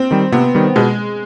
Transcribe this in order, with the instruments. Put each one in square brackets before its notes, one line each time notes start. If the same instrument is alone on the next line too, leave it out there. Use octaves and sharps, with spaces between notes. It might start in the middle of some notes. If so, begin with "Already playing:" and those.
Already playing: [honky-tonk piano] C4
[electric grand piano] D#3 G3
[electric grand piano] C3 [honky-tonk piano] B3
[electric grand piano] D#3 G3
[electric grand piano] B2 [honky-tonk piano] G#3